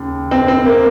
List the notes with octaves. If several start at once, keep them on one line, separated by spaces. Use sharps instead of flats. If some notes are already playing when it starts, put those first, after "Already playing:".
Already playing: D#2 C#3
C4
C4
A#3